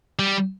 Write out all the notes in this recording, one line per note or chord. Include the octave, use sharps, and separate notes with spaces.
G3